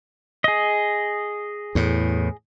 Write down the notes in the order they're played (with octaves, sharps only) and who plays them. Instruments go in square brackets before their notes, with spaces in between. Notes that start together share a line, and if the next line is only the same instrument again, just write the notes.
[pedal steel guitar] G#4 D#5
[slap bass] E2 A2